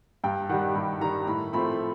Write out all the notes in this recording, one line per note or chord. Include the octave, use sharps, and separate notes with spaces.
G2 G5
D#3 G3 F#5
G2 B5
D#3 G3 A#5
A2 B5
F3 A3 C4 B5